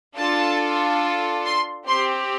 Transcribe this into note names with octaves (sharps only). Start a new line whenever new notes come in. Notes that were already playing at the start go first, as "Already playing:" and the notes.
D4 F4 A4 A5
C6
C4 G4 C6